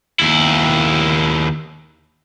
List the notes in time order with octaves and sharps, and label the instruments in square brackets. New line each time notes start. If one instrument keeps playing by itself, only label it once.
[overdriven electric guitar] D#2 E4